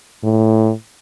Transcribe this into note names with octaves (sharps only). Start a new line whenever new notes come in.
A2